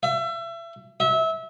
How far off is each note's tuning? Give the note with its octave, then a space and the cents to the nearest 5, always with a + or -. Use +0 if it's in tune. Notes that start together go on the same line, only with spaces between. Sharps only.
E5 +30
E5 -25